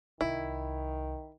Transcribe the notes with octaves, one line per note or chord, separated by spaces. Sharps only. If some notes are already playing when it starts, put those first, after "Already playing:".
C2 D#3 E4